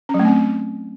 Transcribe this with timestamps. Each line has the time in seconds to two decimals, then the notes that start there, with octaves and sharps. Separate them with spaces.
0.09 C#4
0.14 F#3
0.20 A3
0.25 C4